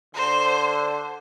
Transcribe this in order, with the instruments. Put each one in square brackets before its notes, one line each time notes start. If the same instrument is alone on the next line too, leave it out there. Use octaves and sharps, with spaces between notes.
[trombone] D3 [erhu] C5